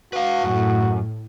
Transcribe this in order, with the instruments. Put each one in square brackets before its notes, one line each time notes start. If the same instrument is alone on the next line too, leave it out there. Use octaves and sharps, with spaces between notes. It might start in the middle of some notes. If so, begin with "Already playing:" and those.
[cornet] F#4 [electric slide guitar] B4 F5
[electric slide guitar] F#2 [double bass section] A2